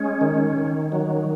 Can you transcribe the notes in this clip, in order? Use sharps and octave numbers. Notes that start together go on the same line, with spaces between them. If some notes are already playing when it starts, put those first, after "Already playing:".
Already playing: G#3 C#4
D#3
D#3
F#3